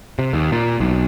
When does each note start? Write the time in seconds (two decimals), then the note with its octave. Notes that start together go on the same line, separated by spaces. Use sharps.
0.19 C3
0.33 D#2
0.52 A#2
0.80 B1